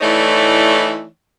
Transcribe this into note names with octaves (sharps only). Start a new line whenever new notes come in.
E3 A3 D#4 E4 C#5 D5